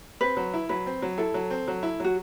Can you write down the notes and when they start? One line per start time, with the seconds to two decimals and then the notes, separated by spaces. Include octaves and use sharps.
0.21 C4 B4
0.37 F#3
0.54 E4
0.69 F#3 B4
0.86 C4
1.02 F#3
1.18 E4 A4
1.34 F#3
1.50 C4
1.68 F#3
1.83 E4
2.00 F#3 F#4